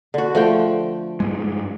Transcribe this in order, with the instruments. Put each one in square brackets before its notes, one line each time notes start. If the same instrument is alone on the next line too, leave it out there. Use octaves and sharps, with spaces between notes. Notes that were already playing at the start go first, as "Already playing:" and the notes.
[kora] D3 F#4
F3 A3 G5
[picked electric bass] G2 G#3